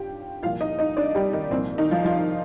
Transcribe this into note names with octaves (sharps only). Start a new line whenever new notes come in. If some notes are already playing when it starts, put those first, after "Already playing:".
Already playing: G2 F4 G4 G5
C2 A#2 F3 F4 F5
D#4 D#5
D#4 D#5
D4 D5
G3 G4
D#3 D#4
C2 A#2 F3 C4
D#3 D#4
F3 F4
F3 F4